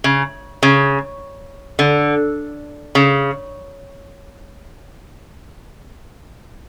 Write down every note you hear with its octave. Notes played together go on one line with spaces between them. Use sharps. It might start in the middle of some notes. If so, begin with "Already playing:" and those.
C#3
C#3
D3
C#3